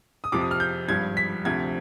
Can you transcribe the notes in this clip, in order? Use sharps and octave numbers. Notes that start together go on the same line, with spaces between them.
D#6
F2 C3 F3 D6
D#6
F6
G6
G#1 G2 F3 G#6
B6
D2 C3 F3 C4 G#6